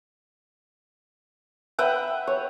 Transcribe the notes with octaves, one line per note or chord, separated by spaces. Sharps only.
B4 E5 F#5 G5
C#5